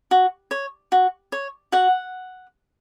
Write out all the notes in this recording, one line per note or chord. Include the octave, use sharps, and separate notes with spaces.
F#4
C#5
F#4
C#5
F#4 F#5